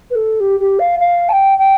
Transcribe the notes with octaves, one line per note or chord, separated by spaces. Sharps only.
B4
A4
G4
G4
F5
F5
A5
G5
G5